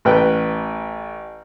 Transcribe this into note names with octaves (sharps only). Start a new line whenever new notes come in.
A1 B4 G5